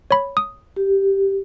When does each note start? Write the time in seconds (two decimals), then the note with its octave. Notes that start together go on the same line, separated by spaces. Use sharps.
0.11 C#5 B5
0.37 D#6
0.76 G4